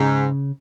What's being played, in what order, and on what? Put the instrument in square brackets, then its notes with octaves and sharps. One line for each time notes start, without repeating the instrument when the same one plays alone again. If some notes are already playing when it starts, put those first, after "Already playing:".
Already playing: [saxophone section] G#2 [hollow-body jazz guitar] C#3